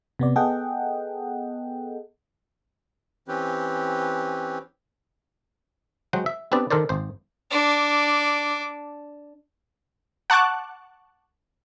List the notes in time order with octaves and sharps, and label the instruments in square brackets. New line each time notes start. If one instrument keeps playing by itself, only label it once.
[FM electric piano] C3 B3 D5
B3 G#4 A4 D#5 F#5 G5
[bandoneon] E3 C4 C#4 G4 B4
[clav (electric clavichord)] F#3 G#3 C5 F#5 G5
E5
B3 C4 D4 G4 B4 D5
D#3 A4 A#4 C5 D5
G#1 C5
[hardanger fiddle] D4 D6
[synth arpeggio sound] F#5 A5 C#6 D6 F#6